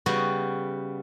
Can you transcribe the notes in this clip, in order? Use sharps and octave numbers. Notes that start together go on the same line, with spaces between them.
C#3 G3 B3 F#4 D#5 G#5